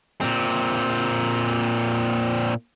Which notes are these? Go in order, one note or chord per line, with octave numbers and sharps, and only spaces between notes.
A#2 C4